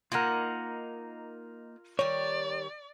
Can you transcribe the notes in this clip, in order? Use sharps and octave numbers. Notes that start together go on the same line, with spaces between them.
A#3 D#4 F4 A#4 F#5
D#3 G3 C#5 D5